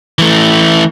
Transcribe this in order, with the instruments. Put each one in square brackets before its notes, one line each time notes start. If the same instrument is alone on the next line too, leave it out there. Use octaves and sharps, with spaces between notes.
[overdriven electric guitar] E3 A3